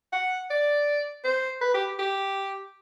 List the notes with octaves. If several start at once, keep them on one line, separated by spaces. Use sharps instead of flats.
F#5
D5
C5
B4
G4
G4